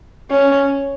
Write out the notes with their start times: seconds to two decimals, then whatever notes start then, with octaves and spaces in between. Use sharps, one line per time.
0.30 C#4